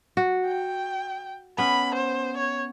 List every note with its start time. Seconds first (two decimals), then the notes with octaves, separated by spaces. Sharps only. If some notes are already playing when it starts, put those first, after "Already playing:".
0.17 F#4
0.46 G5
1.58 B3 C#4 B5
1.95 C5
2.37 C#5